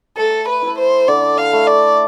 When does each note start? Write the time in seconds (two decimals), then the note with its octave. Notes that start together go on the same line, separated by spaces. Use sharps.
0.17 A3 A4
0.48 B4
0.62 E4 A4
0.78 C5
1.08 D3 D5
1.38 F5
1.53 A3 E4
1.67 D5